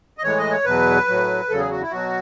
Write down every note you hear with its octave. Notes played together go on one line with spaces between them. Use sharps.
D#5
A2 E3 G#3 C#5
D#5
C#5
E2 B2 F#3 B4
A2 F#3
E2 C#3 F#3 A4
G#4
F#4
E4
B2 F#3 F#4